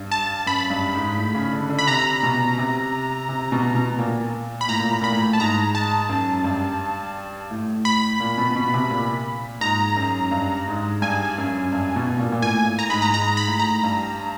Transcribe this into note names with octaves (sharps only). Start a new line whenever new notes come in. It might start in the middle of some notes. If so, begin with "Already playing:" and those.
Already playing: G2
A5
F#2 B5
G2
G#2
A2
C#3
D3
D3
B5
C3 A#5
B2
C3
C3
B2
B2
A#2
B5
A2 A#5
A#2
A2
A#2 B5
A2
A5
G#2 A#5
A5
F#2
G2
A2
B5
A#2
B2
B2
C3
A#2
G#2 A#5
F#2
G2
G#2
G2 G#5
F#2
G2
B2
A#2
A#2
A2 G#5
A2
A#5
G#2 B5
A#5
G#2 A#5
B5
A2
A#5
G2